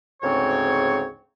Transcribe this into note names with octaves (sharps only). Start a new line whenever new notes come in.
D2 G#2 C#3 C4 C#5